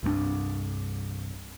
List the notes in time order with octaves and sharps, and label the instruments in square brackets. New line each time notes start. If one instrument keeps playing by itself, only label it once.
[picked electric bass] C2 G2 G#3 D4